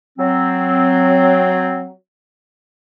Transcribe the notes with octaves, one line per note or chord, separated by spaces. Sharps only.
F#3 C4